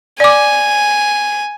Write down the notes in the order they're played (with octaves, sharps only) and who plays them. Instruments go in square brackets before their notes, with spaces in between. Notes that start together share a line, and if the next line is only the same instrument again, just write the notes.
[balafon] D5 D6 [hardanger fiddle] G#5